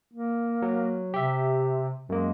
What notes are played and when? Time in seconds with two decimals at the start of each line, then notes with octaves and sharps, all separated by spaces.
0.13 A#3
0.62 F#3
1.14 C3 G4 E5
2.09 F#2 G#3 A#3